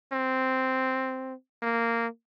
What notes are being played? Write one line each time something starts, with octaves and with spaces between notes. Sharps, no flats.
C4
A#3